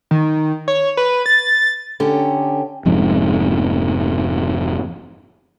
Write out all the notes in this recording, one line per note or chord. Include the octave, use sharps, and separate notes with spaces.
D#3
C#5
B4
A6
D3 C#4 G4
F1 F2 G#2